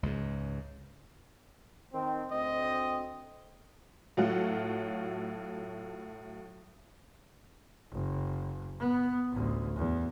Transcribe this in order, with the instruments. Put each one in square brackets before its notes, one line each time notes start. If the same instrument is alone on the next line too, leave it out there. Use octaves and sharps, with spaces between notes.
[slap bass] C#2 G#2
[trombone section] D#3 C4
[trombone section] D2 C4 [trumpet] D#5
[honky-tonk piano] A2 F#3 A3 F4 F#5
[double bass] F#1
B3
A1 D2
E2